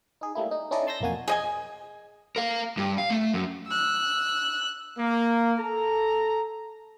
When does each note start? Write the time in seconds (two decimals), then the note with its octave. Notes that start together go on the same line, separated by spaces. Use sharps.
0.21 D#4 G#4
0.35 G3 A3 A#3 E4
0.51 D#4
0.71 C#4 D#4 E4 A4 D5 D#5
0.87 A5 C6 E6 G6 A#6
1.01 B1 F2 A#3 F#4 G#5
1.28 G#4 D#5 G#5
2.36 A#4 F5
2.77 G2
2.98 F5
3.10 A3
3.33 F#2
3.67 E6 F#6
4.98 A#3
5.58 A4 A#5